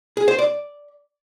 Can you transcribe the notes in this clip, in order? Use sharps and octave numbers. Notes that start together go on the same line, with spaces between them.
G#4
C5
D5